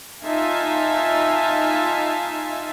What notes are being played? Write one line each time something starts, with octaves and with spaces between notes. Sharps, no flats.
D#4 F4 E5 F5 G#5 A5